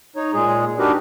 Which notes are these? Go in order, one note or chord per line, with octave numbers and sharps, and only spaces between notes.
D#4 C#5
A#2 G#3 G#4
D4 D#4 F#4 G4 A#4 B4